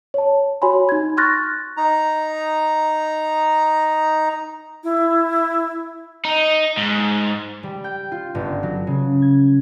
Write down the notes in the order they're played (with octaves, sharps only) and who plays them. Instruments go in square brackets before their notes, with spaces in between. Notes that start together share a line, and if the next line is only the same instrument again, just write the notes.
[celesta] C#5 A5
F#4 C#5 G#5 B5 C6
D#4 G#6
C6 C#6 F6 F#6 A6 A#6
[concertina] D#4 A#5
[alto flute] E4
[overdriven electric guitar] D#4
G#2
[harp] G3
G5
F4
G1
F#3
C#3
G#6